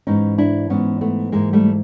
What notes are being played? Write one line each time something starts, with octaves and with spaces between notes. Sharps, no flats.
G#2 E3 C#4 D#4
D4 E4
G#2 E3 B3 C#4
A3 B3
G#2 E3 G#3 A#3
G3 A3